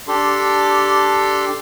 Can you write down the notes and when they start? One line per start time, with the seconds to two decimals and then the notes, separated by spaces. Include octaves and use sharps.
0.08 D4 G4 A4 C6